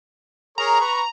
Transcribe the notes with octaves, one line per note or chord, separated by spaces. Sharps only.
G#4 A#4 C#5 A#5
B4 C#6